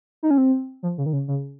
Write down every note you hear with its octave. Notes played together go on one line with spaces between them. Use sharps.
D#4
C#4
C4
F3
C#3
D#3
C#3
C#3